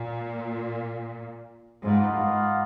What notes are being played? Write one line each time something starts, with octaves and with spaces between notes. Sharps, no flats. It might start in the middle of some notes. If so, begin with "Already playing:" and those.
Already playing: A#2
G#2 A#3 F4 B4 D#5 F#5
G#2